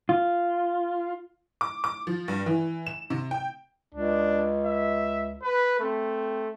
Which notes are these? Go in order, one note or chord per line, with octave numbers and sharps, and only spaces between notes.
F4
D6
D6
F3
G2
E3
E7
C3
G5
C#2 D4
E5
B4
A3 C4